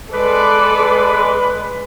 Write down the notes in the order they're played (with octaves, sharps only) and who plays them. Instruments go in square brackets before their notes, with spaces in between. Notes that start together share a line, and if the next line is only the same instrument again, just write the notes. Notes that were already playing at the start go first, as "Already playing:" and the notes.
[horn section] G#3 B4 [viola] A4 D5